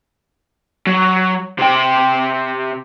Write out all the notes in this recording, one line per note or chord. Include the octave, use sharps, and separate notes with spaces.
F#3
C3 G5